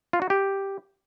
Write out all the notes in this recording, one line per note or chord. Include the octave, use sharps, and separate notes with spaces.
F4
F#4
G4